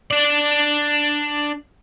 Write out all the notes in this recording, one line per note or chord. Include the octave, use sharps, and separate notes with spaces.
D4 D5